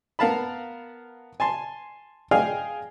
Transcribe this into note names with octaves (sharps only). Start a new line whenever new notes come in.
B3 A#4 F5 A5 B5
G#5 A5 C6
G#4 D#5 F5 G5 G#5 F6